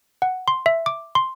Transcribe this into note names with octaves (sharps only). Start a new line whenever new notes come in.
F#5
C6
E5
D6
C6